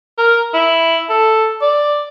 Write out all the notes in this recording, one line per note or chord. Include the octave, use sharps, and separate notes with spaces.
A#4
E4
A4
D5